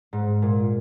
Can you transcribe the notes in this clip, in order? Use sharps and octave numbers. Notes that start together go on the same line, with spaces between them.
G#2
A#2